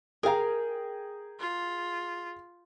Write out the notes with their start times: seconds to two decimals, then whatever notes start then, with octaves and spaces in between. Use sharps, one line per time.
0.23 G#4 A#4 F5 G5 A#5
1.40 F4